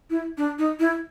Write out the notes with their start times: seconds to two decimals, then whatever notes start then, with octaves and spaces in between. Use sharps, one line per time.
0.10 E4
0.37 D4
0.58 D#4
0.79 E4